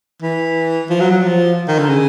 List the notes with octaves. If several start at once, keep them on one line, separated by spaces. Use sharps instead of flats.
E3
F3
F#3
F#3
F3
D#3
D3
C#3